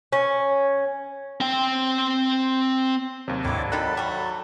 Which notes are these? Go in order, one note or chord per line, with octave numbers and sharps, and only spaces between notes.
C#4
C4 G5
D#2 C3 F#3
D2 G#2 D3 D#3 E4 C#5 D6
D5
D#3 F#3 D#4 A4 A5 B5 F#6
G3 A3 C#6